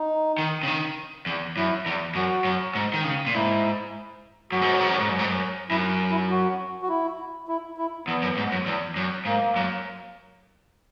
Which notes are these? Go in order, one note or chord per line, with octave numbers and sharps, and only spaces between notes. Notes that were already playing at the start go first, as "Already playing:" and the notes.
Already playing: D#4
D#3
C#3
D#3
E2
F#2 E4
E2
F#2 F#4
F#2
G#2
D#3
C#3
A#2
G#2 E4
F#2 F#4
G#2
F#2
G#2
F#2
G#2
F#2
G#2
F#2
F#2 E4
E4
F#4
F#4
E4
E4
E4
E2 B3
F#2
G#2
F#2
E2
F#2
G#2 A#3
F#2